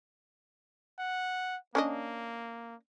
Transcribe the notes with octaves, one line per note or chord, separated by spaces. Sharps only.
F#5
A#3 C#4 D4 D#5